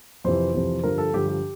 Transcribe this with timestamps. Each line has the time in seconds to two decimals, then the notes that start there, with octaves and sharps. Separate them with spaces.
0.24 F2 C3 E3 C5
0.54 F2 C3 E3
0.84 G2 D3 F3 A#4
0.98 A4
1.13 G2 D3 F3 G4
1.28 G4